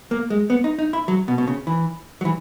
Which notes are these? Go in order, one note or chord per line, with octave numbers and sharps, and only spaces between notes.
A#3
G#3
B3
D#4
D#4
E4
F#3
B2
B2
C#3
E3
F#3
E3